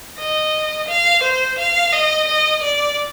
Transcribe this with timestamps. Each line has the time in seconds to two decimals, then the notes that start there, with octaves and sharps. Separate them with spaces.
0.18 D#5
0.88 F5
1.23 C5
1.58 F5
1.93 D#5
2.28 D#5
2.62 D5